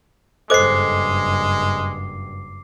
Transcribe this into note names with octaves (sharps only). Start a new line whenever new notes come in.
F#1 G2 G#3 A4 C5 D#5 D6 C7